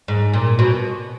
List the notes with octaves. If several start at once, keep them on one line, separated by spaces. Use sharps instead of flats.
G#2
A#2
B2